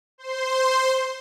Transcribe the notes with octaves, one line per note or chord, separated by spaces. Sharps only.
C5 C6